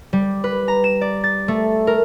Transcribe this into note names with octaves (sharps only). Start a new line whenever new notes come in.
G3
B4
A#5
E7
D5
A6
A3
A#4